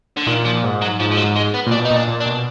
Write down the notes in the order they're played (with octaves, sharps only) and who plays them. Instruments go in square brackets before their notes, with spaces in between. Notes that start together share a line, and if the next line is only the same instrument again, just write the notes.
[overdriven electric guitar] D3
[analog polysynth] A#2 [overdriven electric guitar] D#3
[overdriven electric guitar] F3
[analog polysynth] G#2
[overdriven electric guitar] F#3
[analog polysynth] G#2 [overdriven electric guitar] F3
[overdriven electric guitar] F3
F#3
[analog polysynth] G#2
[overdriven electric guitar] G#3
B3
[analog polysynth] A#2
[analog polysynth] B2 [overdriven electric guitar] D4
[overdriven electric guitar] D#4
[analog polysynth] A#2
[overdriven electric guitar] D4
[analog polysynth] A#2
[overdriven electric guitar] D4
[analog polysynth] B2